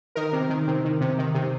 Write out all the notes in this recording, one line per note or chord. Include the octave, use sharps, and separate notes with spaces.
D#3 A#4
C3
D#3
C3
D#3
C3
D#3
C3